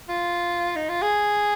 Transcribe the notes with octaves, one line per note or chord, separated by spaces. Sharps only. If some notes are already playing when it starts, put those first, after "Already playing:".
F4
D#4
F4
G#4